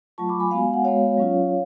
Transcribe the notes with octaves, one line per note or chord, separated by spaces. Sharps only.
F#3 A3 F4 A5 C#6
B5 D6
G#5 B5
G#3 B3 F#4 F5 G#5
F#5
G#3 B3 F#4 C#5 F5
F#3 C#4 F4